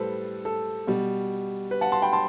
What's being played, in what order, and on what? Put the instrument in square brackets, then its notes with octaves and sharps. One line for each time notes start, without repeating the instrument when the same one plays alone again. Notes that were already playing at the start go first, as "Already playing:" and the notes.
Already playing: [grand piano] A2 G3 A4 B4 C5
A4
B2 G3
B4
F#5 A5
A5 C6
G5 B5
A5 C6